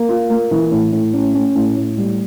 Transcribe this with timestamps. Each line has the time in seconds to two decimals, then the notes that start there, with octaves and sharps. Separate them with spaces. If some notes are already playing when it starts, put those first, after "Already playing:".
Already playing: A#3
0.09 F4
0.30 A#3
0.51 E3
0.72 A2
0.92 A2
1.13 C#4
1.34 C#4
1.55 A2
1.77 A2
1.98 G3